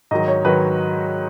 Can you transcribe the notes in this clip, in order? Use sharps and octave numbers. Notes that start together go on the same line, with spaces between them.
G#2 D#3 F#3 D#5
C#5
G#2 D#3 F#3 B4